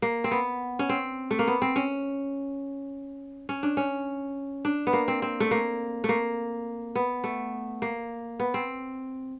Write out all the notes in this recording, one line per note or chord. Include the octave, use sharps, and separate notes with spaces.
A#3
C4
B3
C#4
C4
A3
A#3
B3
C4
C#4
C#4
D4
C#4
D4
B3
A#3
C4
C4
A3
A#3
A3
A#3
B3
A3
A#3
B3
C4